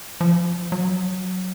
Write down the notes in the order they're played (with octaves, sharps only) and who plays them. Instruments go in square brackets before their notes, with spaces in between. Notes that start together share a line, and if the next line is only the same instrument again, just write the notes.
[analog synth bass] F3
F#3